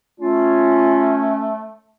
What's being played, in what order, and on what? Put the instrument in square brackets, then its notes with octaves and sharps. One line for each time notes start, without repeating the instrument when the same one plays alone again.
[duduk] A3 [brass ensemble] C#4 [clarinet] F4